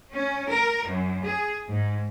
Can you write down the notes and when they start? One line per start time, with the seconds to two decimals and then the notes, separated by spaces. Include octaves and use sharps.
0.13 C#4
0.47 A#4
0.86 F#2
1.23 G#4
1.68 G#2